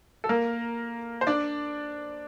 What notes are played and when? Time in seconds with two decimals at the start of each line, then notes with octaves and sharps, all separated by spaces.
0.24 A4
0.29 A#3 A#4
1.21 C5
1.27 D4 D5